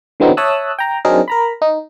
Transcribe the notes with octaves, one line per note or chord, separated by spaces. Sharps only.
D3 E3 F#3 B3 C4 D#4
C#5 E5 A5 D#6 E6 F#6
G5 A#5
F#3 C4 D4 D#4 G#4 A#4
A#4 A#5 B5
D#4